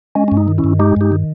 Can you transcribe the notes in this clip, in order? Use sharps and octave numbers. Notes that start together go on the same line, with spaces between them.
G#3 C#4
G2 C#4
D#4
D#3
C#4 E4
G2
G#3 D#4 G4
G2 D#4 G4
D#3